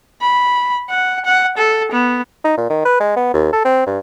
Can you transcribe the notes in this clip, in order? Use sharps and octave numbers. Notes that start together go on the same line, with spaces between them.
B5
F#5
F#5
A4
B3
D#4
A#2
D#3
B4
G#3
B3
D#2
A4
C4
G2